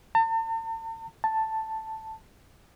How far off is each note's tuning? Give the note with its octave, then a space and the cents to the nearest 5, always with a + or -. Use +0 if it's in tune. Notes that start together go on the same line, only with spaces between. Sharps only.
A5 +45
A5 +5